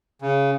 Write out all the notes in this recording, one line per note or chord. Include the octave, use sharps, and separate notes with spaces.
C#3